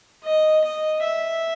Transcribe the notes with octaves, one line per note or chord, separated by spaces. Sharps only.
D#5
D#5
E5